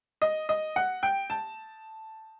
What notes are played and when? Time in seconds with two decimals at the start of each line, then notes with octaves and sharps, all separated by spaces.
0.22 D#5
0.49 D#5
0.76 F#5
1.03 G5
1.30 A5